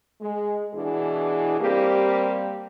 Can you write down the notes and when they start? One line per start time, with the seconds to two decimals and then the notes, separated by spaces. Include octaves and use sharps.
0.22 G#3
0.74 B2 E3 D4 G#4
1.60 G3 A#3 C4 G4